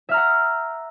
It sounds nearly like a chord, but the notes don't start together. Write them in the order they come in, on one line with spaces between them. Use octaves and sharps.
E5 F6 A#5 F#5